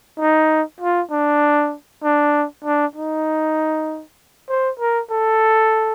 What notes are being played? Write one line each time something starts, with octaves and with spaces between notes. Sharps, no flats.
D#4
F4
D4
D4
D4
D#4
C5
A#4
A4